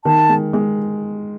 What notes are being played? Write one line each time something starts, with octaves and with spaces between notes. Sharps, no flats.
D#3 A5
G#3
G#3